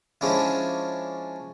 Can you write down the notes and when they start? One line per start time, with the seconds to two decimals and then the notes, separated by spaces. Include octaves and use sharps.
0.21 F3 G#3 C#4 D4 E4